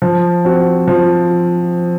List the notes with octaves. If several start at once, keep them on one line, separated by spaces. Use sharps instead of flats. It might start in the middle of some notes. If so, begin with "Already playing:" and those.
F3
C4 F#4
F3